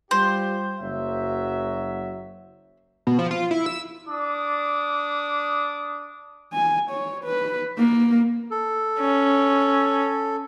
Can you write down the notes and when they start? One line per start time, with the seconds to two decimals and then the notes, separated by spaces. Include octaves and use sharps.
0.11 G3 F4 G4 C5
0.80 F#1 F#3 E5
3.07 B2
3.19 F3
3.31 F4
3.51 E4
3.66 E6
4.08 D4 D6 D#6
6.53 G#5
6.91 C#5
7.25 B4
7.78 A#3
8.51 A4
9.00 C#4